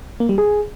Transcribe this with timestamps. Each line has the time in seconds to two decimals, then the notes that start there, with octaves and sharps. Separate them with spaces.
0.20 A#3
0.29 G3
0.38 G#4